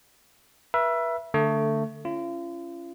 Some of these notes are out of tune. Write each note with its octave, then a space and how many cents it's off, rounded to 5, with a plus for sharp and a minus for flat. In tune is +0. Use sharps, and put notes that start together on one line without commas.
B4 -35 E5 +15
D3 +0 A3 +15
C#4 +0 F4 -40